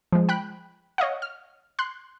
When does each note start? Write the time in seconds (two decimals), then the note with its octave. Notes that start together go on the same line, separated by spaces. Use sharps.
0.12 F3 G#3
0.29 G5 B5 F#6
0.98 C#5 D#5 F5 F#5
1.22 F6
1.79 C6 F#6